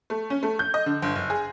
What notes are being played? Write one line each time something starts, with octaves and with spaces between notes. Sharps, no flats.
A3
C#4
A3
G6
D#5
D3
G1
F#1
G#4